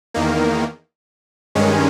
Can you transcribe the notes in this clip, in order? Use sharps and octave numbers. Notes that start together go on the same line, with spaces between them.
E2 D#3 A#3
G2 D#3 G#3 C#4